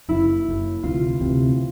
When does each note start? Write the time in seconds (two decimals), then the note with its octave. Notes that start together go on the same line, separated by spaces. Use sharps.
0.08 F#1 F#2 C#3 E4
0.46 F#1 F#2 C#3
0.83 D2 C3 E3 F4
1.21 D2 C3 E3